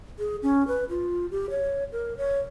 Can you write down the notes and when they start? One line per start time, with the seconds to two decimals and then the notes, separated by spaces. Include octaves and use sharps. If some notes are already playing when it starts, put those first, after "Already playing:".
0.19 G#4
0.43 C#4
0.68 B4
0.89 F4
1.31 G4
1.50 C#5
1.92 A#4
2.17 C#5